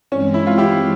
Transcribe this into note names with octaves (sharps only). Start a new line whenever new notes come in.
G2 E3 G#3 C4 C#4
E4
F4
E4 G4